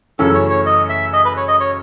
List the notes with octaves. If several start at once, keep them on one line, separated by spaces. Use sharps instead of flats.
F#2 C#3 E3 A3 C#4 A4
C#5
C#5
D#5
E5
D#5
B4
C#5
D#5
C#5